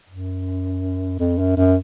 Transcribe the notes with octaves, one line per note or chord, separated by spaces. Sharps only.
F#2
F2
F#2
F#2